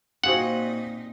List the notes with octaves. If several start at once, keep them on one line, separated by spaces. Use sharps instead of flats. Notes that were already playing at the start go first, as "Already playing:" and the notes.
A#2 C4 D#4 F4 F#4 G#4 C5 F#5